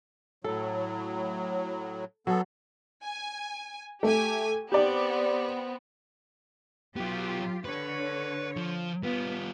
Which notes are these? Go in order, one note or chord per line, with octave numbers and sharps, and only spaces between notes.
A2 F#3 A4
F#3 B3 A4
G#5
A3 G4 G#5
B3 C4 G4 D5
F#3 B3 F4 G4
D3 B4 C#5
F3
G3 B3 F4